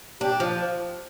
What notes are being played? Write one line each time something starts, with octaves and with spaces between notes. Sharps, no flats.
D4 G4
F3